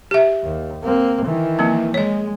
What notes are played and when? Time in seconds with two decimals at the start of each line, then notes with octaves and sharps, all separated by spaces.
0.11 G4 E5
0.43 D#2
0.84 A#3 C4
1.24 D#3 E3
1.59 F3 A#3 C4
1.94 G#3 C#5 D#5